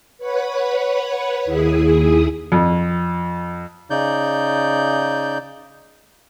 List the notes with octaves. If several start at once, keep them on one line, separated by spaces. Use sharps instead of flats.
B4 C#5 F#5 B5
D#2 E4 G#4 D#6
F2
C#3 D#4 D5 G6